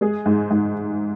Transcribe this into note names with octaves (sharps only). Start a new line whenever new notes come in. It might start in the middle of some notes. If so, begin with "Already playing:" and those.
G#3 G#4
G#2
G#2